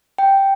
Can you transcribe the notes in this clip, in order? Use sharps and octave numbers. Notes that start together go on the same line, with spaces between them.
G5